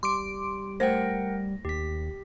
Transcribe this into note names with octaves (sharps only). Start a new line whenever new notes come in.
G3 C6 D6 D7
A3 A#4 C5 F#5 G5 A#6
D#2 G4 B6